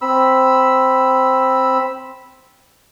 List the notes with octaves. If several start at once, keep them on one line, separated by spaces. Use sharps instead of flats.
C4 B5 E6